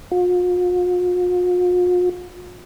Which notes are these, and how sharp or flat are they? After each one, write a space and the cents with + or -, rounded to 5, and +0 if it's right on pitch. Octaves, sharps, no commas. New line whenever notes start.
F4 +45